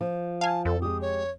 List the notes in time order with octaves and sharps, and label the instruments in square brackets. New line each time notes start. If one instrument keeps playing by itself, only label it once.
[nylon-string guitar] F3
[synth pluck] F5 G#5 [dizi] A5
[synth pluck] F2 [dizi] A4
[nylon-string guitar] G#3 G4 [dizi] D#6
[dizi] C#5